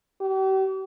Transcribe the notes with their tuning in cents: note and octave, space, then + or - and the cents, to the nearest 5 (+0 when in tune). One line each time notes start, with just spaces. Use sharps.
G4 -40